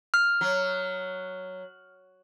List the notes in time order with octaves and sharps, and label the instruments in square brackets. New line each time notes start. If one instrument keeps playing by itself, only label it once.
[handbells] F6
[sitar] F#3